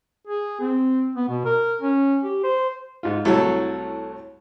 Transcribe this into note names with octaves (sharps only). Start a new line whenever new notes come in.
G#4
C4
B3
B2
A#4
C#4
G4
C5
G#2 F4
C2 A2 F#3 A4 C#5